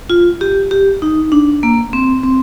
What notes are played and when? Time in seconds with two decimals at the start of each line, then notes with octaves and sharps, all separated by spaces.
0.10 F4
0.41 G4
0.71 G4
1.02 D#4
1.32 D4
1.63 A#3
1.93 C4
2.23 C4